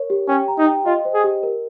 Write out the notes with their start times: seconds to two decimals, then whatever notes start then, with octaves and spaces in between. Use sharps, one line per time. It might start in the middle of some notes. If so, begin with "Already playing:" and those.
Already playing: A#4 C#5
0.10 G4
0.28 C#4 G5
0.48 A#5
0.58 D#4
0.67 G5
0.86 F4 D#5
1.05 C5
1.14 G#4
1.24 G4
1.43 A#4